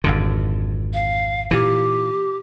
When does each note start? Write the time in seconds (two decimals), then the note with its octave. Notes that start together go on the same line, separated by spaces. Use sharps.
0.04 G#1 F2 D3
0.94 F5
1.51 A#2 E3 G4